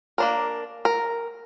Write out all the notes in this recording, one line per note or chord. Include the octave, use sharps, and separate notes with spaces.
A#3 D4 A#4
A#4